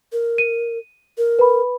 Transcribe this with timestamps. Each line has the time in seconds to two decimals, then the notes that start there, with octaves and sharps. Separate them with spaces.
0.12 A#4
0.38 D#7
1.18 A#4
1.39 B4 B5